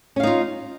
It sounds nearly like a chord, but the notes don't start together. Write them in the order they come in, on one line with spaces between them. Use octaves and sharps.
C#4 F5 D#4 F4